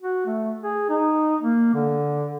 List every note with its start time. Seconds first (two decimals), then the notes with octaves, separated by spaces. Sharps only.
0.02 F#4
0.26 A3
0.64 G#4
0.90 D#4
1.42 A#3
1.74 D3